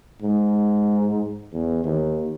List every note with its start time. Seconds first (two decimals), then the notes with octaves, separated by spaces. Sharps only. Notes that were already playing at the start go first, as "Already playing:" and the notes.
0.22 G#2
1.53 E2
1.84 D#2